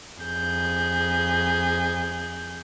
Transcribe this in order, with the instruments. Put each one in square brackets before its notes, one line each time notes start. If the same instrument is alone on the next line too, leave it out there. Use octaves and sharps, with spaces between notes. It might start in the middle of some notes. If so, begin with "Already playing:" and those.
[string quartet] F2 G#4 G6